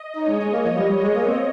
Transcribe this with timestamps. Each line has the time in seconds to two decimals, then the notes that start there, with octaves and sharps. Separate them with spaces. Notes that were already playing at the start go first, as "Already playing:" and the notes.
Already playing: D#5
0.16 D#4 C#5
0.28 G#3
0.41 G#3
0.53 A#3
0.65 F3
0.77 G3
0.90 G3
1.02 G#3
1.15 A#3
1.27 C4